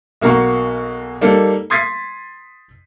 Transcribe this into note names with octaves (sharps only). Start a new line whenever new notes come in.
B1 A#3 F#4 F5 A#5 C#6
G3 A#3 D#4 A4
C6 D#6 G#6 A6 B6 C7